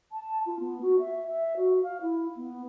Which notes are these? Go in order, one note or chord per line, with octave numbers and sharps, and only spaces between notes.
A5
F4
B3
F#4
E5
E5
F#4
F5
E4
B3